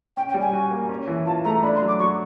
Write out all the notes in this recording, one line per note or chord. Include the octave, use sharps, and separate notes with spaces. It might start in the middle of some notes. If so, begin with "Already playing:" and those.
C#4 G5
G5
G3
G#5
F#4
A#3
C#4
E3
F4 A5
A3 A#5
D4 B5
C6
F#3
D6
F#3 C#6